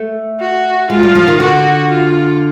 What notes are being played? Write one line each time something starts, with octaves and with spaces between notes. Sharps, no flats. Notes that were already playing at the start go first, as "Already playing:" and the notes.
Already playing: A3
F#4
G#3 F4
G3
F3
D#3
D3 F#4
F4